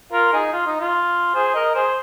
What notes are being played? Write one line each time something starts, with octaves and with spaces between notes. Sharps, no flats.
F4 A#4
D#4 G#4
F4
D#4
F4
G#4 C5
A#4 D#5
G#4 C5